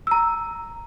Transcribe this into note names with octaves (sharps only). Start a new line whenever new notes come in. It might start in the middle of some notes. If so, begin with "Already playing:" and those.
A#5 E6